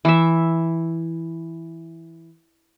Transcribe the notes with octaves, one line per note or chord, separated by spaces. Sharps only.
E3 E5